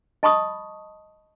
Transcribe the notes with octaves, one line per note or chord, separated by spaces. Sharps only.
D#5 A5 B5 C#6 D#6